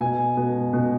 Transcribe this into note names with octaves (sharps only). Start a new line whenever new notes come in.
B2 G#5
B2
B2